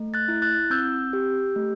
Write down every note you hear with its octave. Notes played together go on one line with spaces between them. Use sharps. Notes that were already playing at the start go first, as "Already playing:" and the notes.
Already playing: A3
F#6 A6
E4
F#6 A6
C4 E6 G6
G4
A3